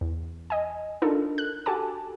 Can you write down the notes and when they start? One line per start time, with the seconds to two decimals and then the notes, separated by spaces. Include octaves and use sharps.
0.01 E2
0.50 D#5 G#5
1.02 D4 D#4 F4 A4 A#4
1.38 F#6
1.66 F#4 G4 A4 G#5 A5 D6